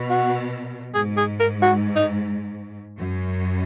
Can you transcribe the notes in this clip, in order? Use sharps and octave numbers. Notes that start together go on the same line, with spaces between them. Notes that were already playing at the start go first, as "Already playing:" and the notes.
Already playing: B2
F#4
G#2 G#4
G#4
A#4
F#4
D#4
F#2